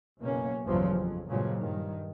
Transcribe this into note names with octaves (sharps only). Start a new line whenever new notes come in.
F#1 B2 A#3 C#4
A1 E2 G2 C#3 F3 F#3
F2
G2 A#2 C#3 F3 F#3 G#3
G2 D#3